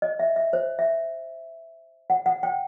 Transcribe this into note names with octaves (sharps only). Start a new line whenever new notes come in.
D#5
E5
E5
C5
E5
F#5
F#5
G5